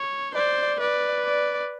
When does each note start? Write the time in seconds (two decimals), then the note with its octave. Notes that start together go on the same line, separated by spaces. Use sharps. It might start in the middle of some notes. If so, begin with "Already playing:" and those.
Already playing: C#5
0.34 C5 D5
0.80 B4 D5
1.25 D5